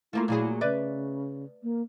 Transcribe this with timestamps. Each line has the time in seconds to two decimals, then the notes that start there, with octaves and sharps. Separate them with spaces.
0.13 A3 A#3 E4 F4
0.28 A#2 F#3 E4 G#4
0.61 C#3 B4 D5 E5
1.63 A#3